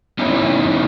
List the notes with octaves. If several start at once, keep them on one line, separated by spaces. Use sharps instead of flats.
B3 C#4 D#4 E4